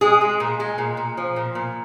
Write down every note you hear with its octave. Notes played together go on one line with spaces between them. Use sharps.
G#3 G#4
G#3
A#2
G#3
A#2
A#2
F3
A#2
A#2